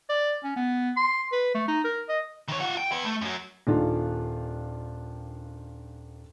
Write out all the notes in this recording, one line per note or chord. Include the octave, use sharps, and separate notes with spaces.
D5
C#4
B3
C6
B4
A3
D#4
A#4
D#5
D#3 C#5
F4 F#5
G5
B3 E4
A3
F#2 F#3
D#1 D#3 D4 F4